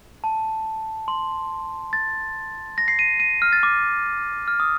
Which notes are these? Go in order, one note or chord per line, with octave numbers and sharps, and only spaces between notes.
A5
C6
A6
A#6
C7
D#7
D#7
F6
A6
D6
F6
D#6